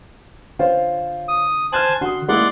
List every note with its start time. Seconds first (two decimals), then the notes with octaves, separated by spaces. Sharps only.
0.59 D3 F4 C5 C#5
1.28 D#6
1.73 C5 G#5 A5 F6 F#6 F#7
2.01 D3 F#4 C6 D#6
2.29 G#3 A#3 E4 D5 F#5 C6